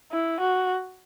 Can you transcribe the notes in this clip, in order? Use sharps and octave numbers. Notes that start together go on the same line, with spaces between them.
E4
F#4